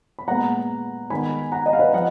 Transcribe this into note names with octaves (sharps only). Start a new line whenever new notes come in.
B5
A#2 G#3 B3 F#5 A#5
D#3 G#3 B3 G#5 B5
F#5 A#5
D#5 F#5
F5
B4 D#5
F3 D#5 F#5